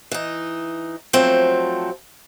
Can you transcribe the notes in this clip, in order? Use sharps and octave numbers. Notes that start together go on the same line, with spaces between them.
E3 D#4
F3 F#3 A3 C4